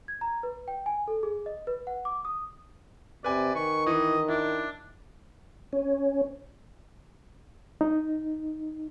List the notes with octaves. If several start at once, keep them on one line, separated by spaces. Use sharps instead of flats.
G#6
A#5
B4
G5
G#5
A4
G#4
D#5
B4
F#5
D6
D#6
C3 B4 D5 G#5
D#3 C#6
E3 D#5
D4 E4
C#4
D#4